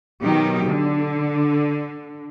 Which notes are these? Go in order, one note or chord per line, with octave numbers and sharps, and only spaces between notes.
B2 D#3 F#3 D#4 G4
D3